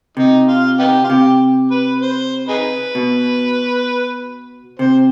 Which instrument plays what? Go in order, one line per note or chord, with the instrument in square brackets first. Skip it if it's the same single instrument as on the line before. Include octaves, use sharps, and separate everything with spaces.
[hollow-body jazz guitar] C3 [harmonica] D#4
[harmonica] F4
B3 D#4 G4
F4
[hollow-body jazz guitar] C3 [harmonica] G4
[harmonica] B4
C5
D#4 G#4 B4
[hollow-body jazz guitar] B2
[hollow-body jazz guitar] C3 [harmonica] C5